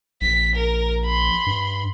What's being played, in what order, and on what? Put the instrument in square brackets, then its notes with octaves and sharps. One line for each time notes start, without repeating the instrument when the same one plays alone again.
[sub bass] A#1 [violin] B6
[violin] A#4
B5 C6
[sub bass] G2